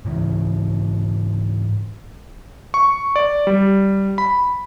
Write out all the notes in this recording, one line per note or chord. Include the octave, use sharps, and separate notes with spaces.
G#2 C#3 E3
C#6
D5
G3
B5